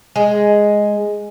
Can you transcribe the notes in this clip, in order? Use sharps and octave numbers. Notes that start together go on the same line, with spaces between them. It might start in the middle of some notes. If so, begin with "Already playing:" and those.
G#3